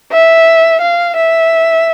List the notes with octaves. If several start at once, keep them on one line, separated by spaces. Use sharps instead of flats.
E5
F5
E5